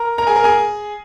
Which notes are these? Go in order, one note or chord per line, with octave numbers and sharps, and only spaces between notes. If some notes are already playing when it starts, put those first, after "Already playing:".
Already playing: A#4 A#5
A#4 A#5
G#4 G#5
A#4 A#5
G#4 G#5